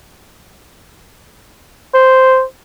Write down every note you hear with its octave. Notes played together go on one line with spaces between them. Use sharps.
C5